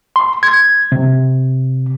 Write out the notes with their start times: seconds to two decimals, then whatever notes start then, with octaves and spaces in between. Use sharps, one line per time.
0.16 C6
0.43 G#6
0.92 C3